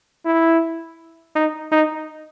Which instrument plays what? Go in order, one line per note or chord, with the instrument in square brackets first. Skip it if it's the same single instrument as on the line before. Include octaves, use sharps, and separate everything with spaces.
[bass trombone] E4
D#4
D#4